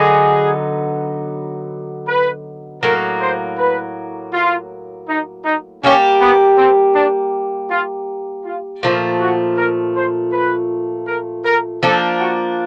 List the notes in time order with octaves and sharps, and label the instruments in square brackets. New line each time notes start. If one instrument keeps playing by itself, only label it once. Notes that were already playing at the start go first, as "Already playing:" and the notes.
Already playing: [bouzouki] D3 F#3 B3 D#4 [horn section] G#4
[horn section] B4
[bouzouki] A2 F#3 A#3 [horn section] A#4
[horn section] C5
B4
F4
D#4
D#4
[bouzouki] G3 A#3 D#4 G4 [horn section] C#4
[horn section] B3
C4
D4
F4
F4
[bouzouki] A#2 F3 A3 [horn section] F4
[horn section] F#4
A#4
C5
B4
A#4
A#4
[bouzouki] F3 A#3 D4 [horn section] A4
[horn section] F#4